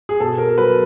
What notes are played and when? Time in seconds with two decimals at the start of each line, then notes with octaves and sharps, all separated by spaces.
0.09 G#4
0.20 B2 A4
0.38 A#4
0.58 F#3 B4